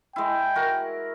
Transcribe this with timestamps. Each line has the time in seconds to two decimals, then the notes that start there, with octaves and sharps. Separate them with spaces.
0.16 G#3 E4 G5
0.55 F#4 A#4